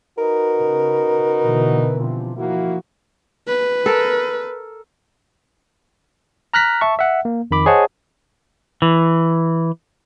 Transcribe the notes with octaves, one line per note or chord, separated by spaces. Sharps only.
D#4 F#4 A#4 B4
C#3
B2 D3 E3
C3 F3
F3 A#3 E4 F#4
B4
A4 A#4
A#5 F6 F#6 A#6 B6
E5 A5 C#6
E5 F#5
A#3
F2 D#3 B5 D6
G#4 C5 C#5 D#5 F#5 A5
E3